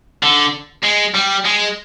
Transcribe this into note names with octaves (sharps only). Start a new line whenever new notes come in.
D3
G#3
G3
G#3